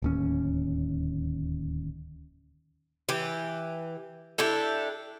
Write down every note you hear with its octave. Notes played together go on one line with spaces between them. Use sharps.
D1 D#2 C#4
E3 G4
D4 E4 G4 A4